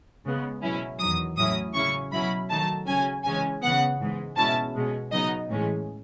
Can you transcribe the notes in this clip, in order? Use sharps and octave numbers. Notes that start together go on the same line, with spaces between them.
C#3 G#3 B3
B2 F#3 C#4 E4
E2 D#3 F#3 D#6
A2 F#3 C#4 E4 D#6
C#3 F#3 C#4 E4 C#6
B2 F#3 C#4 E4 B5
D#3 F#3 A3 D#4 A5
C#3 F#3 C#4 G#5
C#3 E3 G#3 C#4 G#5
C#3 E3 B3 F#5
G#2 E3 G#3
B2 G#3 C#4 E4 A5
B2 G#3 C#4
C#3 F#3 B3 D#4 D#5
A2 E3 G#3 C#4